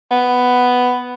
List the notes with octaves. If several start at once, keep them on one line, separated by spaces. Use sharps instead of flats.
B3